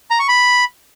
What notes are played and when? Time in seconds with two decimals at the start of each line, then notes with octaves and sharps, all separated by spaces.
0.11 A#5
0.19 C#6
0.28 B5